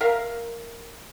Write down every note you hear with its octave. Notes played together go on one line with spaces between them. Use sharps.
A#4 E5 F5